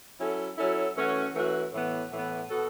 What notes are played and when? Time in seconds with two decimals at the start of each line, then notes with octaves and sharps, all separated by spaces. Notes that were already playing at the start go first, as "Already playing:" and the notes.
0.19 F#3 C#4 E4 A4
0.58 F#3 C#4 E4 A4
0.96 E3 A3 C#4 F#4
1.34 E3 A3 C#4 F#4
1.72 A2 E3 B3
2.12 A2 E3 B3
2.50 B2 B3 F#4 A4